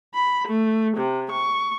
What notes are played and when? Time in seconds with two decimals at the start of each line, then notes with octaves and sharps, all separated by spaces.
0.14 B5
0.46 A3
0.97 C3
1.31 C#6